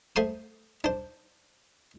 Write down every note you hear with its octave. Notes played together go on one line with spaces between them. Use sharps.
A3 C5 C6 D#6
D4 C5